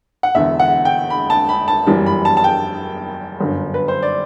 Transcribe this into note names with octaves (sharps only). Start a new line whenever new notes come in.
F#5
E1 E2 D3 E5
F#5
G5
B5
A5
B5
A5
G1 F#2 E3 G3
B5
A5
A5
G5
G1 F#2 D3
B4
C5
D5